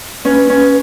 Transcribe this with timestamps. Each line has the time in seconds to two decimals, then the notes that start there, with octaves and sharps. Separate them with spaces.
0.25 C#4 B4
0.50 C#4